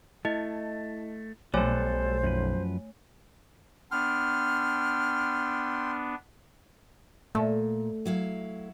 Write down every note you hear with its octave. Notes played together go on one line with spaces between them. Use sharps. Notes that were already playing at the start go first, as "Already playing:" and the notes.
A3 E4 D#5
B1 G3 A3 A4 C5 C#5 G#5
F#2 F3 B4
B3 D4 G5 C6 F6
A#2 A3
F#3 E4 F5